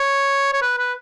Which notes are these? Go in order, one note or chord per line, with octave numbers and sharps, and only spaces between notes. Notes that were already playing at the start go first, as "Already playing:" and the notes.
Already playing: C#5
C#5
B4
B4